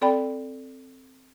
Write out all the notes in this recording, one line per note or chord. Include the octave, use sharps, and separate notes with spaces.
C4 A4 D5 G5 B5